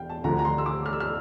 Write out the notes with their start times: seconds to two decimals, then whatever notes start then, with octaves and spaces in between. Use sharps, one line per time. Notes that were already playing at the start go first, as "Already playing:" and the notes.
Already playing: E1 F5 G5
0.10 A5
0.24 D2 D3 F3 A#5
0.39 A#5
0.45 C6
0.58 E6
0.66 D6
0.86 F6
0.93 E6
1.00 F6